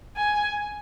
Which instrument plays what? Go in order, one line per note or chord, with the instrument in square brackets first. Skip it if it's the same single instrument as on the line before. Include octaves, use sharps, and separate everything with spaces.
[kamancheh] G#5